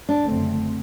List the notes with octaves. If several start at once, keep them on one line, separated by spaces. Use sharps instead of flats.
D4
F#1 F#2 D3 A3 C4